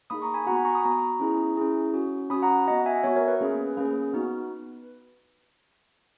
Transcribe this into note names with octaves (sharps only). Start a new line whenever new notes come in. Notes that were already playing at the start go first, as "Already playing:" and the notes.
A#3 D#4 G#4 B5 D#6
A#5 C#6
G#5 B5
B3 F#4 F#5 A#5
G#5 B5
A#5 C#6
B5 D#6
B3 F#4 A#5 C#6
C#4 E4 G#4
C#4 E4 G#4
C#4 F#4
C#4 F#4 B5 D#6
F#5 A#5
B3 F#4 D#5 F#5
E5 G#5
B3 F#4 C#5 E5
A#4 C#5
B4
A#3 C#4 G#4
A#3 C#4 G#4 B4
B3 D#4 F#4